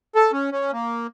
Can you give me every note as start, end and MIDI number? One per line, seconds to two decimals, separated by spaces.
0.15 0.32 69
0.32 0.50 61
0.52 0.71 61
0.73 1.07 58